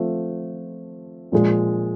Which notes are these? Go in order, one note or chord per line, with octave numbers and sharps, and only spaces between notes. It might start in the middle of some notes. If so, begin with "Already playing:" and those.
Already playing: F3 A3 C4 F4
A#2 F3 G#3